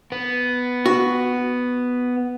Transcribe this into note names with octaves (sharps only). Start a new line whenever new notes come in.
B3
F#4